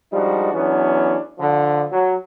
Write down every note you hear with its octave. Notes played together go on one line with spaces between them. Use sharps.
F3 G3 G#3 D4 D#4 F#4
E2 E3 F#3 B3 C#4 D4
D3 F3
F#3